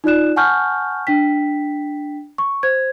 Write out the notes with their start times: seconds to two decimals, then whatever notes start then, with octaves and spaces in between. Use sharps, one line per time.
0.04 D#4 F4 D5 F#6 E7
0.36 F#5 G#5 A5 C#6 F6 G6
1.07 D4 G5 B6
2.38 C#6
2.63 C5 G#6